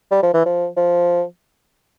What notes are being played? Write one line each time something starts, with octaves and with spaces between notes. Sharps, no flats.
G3
F3
E3
F3
F3